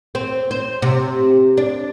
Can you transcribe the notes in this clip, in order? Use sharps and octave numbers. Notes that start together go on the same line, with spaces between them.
C4
C5
C3
D4